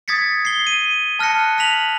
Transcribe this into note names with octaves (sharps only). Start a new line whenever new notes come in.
D#6 G#6 A6 B6 C#7
C7 G7
D#7
A5 F6 F#6 A#6 C#7
F6 A#6 B6 F7 F#7